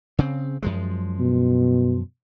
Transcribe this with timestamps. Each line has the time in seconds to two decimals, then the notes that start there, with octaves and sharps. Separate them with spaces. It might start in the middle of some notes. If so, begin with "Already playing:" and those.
0.19 C#3 C4
0.62 F#2 F3 G#3
1.19 B2